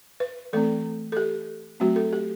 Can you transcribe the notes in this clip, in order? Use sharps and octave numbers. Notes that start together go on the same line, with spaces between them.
B4
E3 A3 C4 A4
A4
G4
F#3 A3 C4 F#4
A4
G4